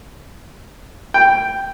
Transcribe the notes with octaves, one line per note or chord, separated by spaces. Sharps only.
G5